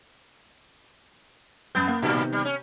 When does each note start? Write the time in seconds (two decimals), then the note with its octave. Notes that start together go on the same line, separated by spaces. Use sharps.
1.75 F#2 B3 G6
1.88 A#3
2.02 A2 C3 D#3 G3 B3
2.33 G3
2.45 C#4